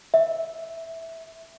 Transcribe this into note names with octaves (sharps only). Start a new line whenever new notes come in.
E5